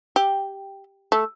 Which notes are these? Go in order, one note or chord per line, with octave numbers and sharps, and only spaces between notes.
G4
A3